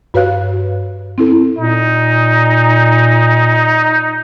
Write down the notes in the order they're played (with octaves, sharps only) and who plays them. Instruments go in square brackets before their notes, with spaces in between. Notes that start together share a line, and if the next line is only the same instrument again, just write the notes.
[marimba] G2 F#4 B4 C#5 F5 F#6
C4 E4 A4
[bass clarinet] A#2 [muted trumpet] D#4